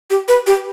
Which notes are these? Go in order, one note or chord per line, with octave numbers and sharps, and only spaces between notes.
G4
B4
G4